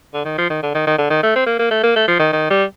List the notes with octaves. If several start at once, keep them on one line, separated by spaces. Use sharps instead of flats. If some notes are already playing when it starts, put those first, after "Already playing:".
D3
D#3
F3
D#3
D3
D#3
D#3
D3
D#3
A3
C4
A#3
A#3
A3
A#3
A3
F3
D#3
D#3
G3